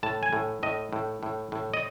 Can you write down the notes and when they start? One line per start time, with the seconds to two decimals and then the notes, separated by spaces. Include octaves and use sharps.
0.03 A2 A5
0.23 G#5
0.33 A2
0.63 A2 D#5
0.93 A2
1.23 A2
1.52 A2
1.74 D#5